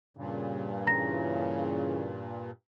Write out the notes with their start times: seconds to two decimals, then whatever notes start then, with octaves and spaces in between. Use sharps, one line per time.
0.17 G2 A#2 C#3
0.87 C#3 E3 A#5 A#6